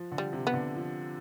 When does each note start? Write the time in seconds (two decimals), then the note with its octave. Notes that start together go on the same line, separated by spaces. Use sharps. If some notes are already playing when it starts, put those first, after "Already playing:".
Already playing: F3
0.11 D3
0.18 G3
0.33 C3
0.47 B3
0.53 D3
0.75 F3